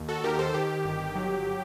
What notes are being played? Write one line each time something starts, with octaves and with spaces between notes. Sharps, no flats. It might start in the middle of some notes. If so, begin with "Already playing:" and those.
Already playing: D#2
F#4 A4
D#3 G4 A#4
A4 C5
D#3 G4
G1
F#3